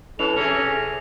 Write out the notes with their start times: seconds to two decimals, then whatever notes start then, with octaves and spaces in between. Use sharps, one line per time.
0.19 E3 C#4 A4 F7
0.36 C3 C#4 G#4